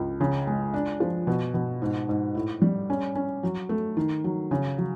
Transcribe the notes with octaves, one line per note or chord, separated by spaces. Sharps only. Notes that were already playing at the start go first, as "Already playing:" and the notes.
Already playing: C#2
C#3
G#3
D4
F3
B2
B2
G#2
G#2
A2
G3
C#4
C#4
F#3
A3
D#3
F#3
C#3
F#3